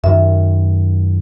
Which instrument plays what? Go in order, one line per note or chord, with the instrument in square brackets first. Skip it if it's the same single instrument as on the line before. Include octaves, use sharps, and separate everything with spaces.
[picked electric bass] F#2 D#3 [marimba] E5